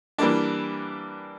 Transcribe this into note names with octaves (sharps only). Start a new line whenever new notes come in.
E3 G3 A#3 D4